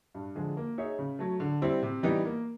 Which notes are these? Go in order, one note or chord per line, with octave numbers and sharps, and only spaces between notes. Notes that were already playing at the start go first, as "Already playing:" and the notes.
G2
D3 F3 G#3
A#3
D#4 G#4 C#5 E5
C#3
F#3 A3
D3
G3 C4 E4
C3
E3 G3 B3 D#4
A#3